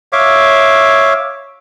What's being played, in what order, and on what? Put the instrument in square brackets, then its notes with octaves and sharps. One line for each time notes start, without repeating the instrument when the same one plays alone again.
[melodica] C#5 E5 F5 D6